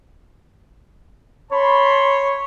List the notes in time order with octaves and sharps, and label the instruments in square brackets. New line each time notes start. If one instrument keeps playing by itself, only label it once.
[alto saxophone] C#5 [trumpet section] A5 B5 C6